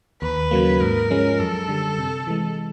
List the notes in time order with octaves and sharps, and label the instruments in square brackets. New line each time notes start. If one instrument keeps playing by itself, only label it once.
[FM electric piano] D#2 [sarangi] B4
[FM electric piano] C#3 F#3 A#3
[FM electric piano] G#2 [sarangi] A#4
[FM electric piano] F3 G#3 C#4
[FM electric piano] F#2 [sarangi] A4
[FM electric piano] D3 G3
C3
E3 G#3